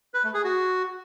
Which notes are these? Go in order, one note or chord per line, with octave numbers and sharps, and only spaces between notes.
B4
A3
G#4
F#4